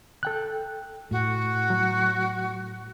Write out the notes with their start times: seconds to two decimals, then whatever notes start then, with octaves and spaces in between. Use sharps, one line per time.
0.23 A4 G5 F#6
1.11 A2 F#4
1.70 F#3